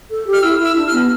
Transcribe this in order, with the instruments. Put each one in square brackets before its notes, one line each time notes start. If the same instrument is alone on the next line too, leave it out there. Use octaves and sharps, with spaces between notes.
[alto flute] A4
G4
[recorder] F6
[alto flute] E4 [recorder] E6
[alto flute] E4 [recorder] E6
[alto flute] D4
[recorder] F6
[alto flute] B3